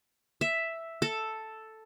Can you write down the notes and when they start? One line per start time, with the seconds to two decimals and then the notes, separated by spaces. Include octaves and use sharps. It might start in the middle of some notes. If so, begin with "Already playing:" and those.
0.41 E5
1.02 A4